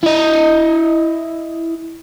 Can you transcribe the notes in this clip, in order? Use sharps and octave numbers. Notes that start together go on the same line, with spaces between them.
E4 D#5